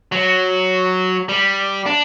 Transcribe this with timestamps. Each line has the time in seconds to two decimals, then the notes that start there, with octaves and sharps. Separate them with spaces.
0.12 F#3
1.29 G3
1.86 D4